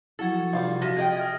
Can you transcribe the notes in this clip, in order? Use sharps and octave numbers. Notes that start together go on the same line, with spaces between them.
F3 F#3 E4 F#4 A4 G#6 A6
C3 G3 F4 F5
F3 F#4 E5 A#6
G#4 D#5 G5
E5 D#6 F6 G#6